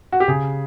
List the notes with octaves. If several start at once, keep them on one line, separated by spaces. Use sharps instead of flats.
F#4
G4
C#3 G#4